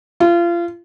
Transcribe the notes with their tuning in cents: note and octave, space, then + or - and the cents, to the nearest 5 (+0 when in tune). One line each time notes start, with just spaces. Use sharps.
F4 -30